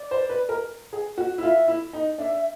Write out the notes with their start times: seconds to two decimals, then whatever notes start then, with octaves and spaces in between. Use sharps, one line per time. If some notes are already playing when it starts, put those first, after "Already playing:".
Already playing: D5
0.11 C5
0.29 B4
0.49 A#4
0.93 G#4
1.18 F#4
1.38 E4
1.43 F4 E5
1.68 E4
1.93 D#4
2.18 D4 E5